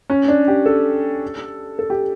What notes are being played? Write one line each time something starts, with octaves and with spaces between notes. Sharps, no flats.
C#4
D4
G4
A4
A4
G4